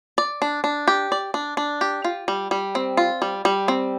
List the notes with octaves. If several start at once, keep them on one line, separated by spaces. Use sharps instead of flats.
D5
D4
D4
G4
D5
D4
D4
G4
F4
G3
G3
C4
F4
G3
G3
C4